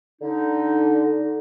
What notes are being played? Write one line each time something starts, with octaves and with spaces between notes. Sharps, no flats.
D3 D#4